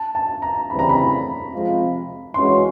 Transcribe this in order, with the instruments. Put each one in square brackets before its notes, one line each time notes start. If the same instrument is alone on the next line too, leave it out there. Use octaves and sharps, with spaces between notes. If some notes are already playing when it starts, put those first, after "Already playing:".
Already playing: [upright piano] A5
A5
A#5
[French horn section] D2 C#3 E3 G3 C4 [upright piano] B5
[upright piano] A#5
B5
[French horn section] C3 F3 G#3 C4 F4
[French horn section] E3 G#3 C#4 F#4 [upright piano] C6